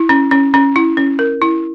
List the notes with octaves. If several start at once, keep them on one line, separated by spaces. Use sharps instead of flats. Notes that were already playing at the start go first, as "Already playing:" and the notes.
Already playing: E4
C#4
C#4
C#4
E4
C#4
A#4
E4